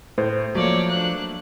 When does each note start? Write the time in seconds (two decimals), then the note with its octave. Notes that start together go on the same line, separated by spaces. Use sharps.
0.18 A2 C5
0.55 F3 F#3 A3 A#3 C#5 D5
0.90 D4 F#6